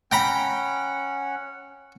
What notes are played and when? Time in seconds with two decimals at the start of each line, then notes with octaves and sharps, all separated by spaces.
0.12 C#4 F#5 G5 A#5 B5